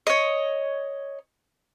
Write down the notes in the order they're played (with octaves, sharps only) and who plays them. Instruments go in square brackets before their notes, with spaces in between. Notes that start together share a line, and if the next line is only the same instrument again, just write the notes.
[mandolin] C#5 D#5